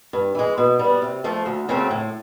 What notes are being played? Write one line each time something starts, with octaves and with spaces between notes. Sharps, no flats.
G2
E3 G#3
B2
G3 B3
C3
F3 A3
D2
C#3 F#3 A3 C4
A2